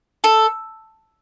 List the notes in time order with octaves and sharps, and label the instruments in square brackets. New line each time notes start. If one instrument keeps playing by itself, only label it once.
[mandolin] A4